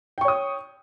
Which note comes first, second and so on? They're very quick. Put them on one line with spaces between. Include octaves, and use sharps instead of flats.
G5 C#6 C#5 D#6